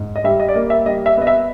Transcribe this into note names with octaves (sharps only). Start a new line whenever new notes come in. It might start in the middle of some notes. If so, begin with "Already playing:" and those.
Already playing: G#2
D#5
G3 E5
D#5
D5
A#3 D#5
E5
G3 D#5
E5
B3 D#5
E5